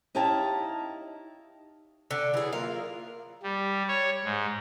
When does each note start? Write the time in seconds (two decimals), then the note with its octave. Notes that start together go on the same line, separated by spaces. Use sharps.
0.15 D#4 E4 G4 C#5 F5 A5
2.11 D3
2.34 E3 F#3 G#4
2.52 A#3 F4 A#4 F5
3.43 G3
3.88 C#5
4.24 G#2